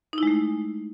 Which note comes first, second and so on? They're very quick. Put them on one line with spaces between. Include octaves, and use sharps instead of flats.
D#4 E4 G#3 A3